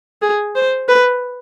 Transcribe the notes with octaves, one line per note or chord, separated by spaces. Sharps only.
G#4
C5
B4